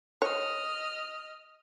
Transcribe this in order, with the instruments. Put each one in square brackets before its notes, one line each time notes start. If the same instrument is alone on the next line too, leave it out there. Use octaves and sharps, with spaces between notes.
[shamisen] C#5 [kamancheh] D#5 F6